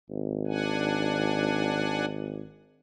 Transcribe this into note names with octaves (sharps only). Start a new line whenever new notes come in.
G#1
D4 F#5 G#5